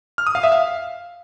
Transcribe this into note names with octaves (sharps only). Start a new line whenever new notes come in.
F6
D#6
F5
E5
F5